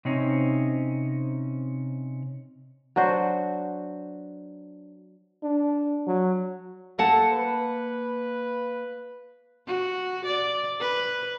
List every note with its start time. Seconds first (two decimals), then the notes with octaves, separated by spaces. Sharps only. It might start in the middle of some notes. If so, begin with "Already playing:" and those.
0.05 C3 C4 C#4 D#4
2.96 F#3 D4 F#4 C5
5.43 D4
6.07 F#3
6.99 A#3 A4 F#5 A5
7.33 B4
9.67 F#4
10.25 D5
10.80 B4